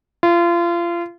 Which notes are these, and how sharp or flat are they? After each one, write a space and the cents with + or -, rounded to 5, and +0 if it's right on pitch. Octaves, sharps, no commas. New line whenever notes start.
F4 -30